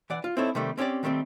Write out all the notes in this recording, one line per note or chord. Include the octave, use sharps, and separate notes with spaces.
E3 D5 F#5
F4
C4 D#4 E4 A4 C#5
C3 D#3 G3 A3
C4 C#4 G4 C5 D5
D#3 G3 A3 A#3 C4